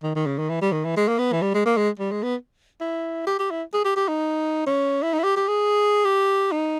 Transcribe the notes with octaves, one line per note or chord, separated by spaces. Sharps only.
D#3
D#3
C#3
D#3
E3
G3
D#3
E3
G#3
A#3
B3
E3
G3
G#3
A#3
G#3
G3
G#3
B3
E4
G4
G4
E4
G#4
G4
G4
D#4
C#4
E4
D#4
E4
G4
G4
G#4
G4
D#4